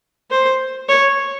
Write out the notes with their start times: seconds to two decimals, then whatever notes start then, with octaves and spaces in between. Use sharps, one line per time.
0.31 C5
0.89 C#5